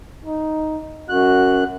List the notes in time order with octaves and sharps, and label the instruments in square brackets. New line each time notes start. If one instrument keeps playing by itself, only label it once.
[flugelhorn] D#4
[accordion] F#2 F#6 [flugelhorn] F#4